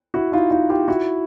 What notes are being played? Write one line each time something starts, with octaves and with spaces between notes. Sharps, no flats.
E4 F#4
D#4 F4
D#4 F4
F4 G4
E4 F#4